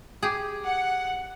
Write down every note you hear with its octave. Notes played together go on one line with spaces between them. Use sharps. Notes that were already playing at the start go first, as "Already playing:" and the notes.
G4 G#4
F#5